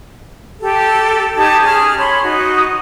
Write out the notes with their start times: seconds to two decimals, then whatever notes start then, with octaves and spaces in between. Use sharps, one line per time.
0.60 G4 A4
1.36 D#4 G4 A5 G#6
1.62 C#4 G#4 F6
1.98 C#5 B5 C6
2.23 D#4 F#4